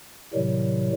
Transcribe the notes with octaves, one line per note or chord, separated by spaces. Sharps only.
A2 C3 D#3 F#3 G3